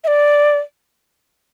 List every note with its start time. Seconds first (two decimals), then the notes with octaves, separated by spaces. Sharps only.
0.04 E5
0.07 D5